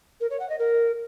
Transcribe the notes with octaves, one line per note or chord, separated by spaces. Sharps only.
A#4
C#5
F#5
D#5
A#4